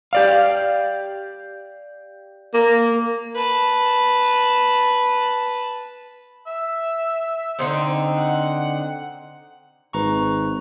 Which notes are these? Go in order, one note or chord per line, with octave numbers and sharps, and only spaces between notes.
G4 D5 F5
A#3
B4 A5
E5
D3 C4 D#4
F#5
G#1 B4 A#5 C#6